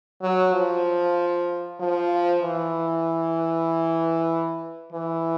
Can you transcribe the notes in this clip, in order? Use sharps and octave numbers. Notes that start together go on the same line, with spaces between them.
F#3
F3
F3
E3
E3